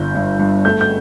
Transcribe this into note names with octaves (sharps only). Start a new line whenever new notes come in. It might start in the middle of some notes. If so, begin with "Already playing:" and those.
Already playing: G1 G2 G6
G2
G2
A3 G6
G6